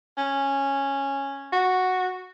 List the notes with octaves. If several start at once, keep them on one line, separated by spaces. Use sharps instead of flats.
C#4
F#4